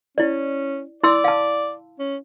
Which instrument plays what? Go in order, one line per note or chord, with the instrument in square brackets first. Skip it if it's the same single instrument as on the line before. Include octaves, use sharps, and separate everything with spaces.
[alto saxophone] C#4 [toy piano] E4 D5
[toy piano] E4 C6 E6 [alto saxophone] D5
[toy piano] F5 A5
[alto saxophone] C#4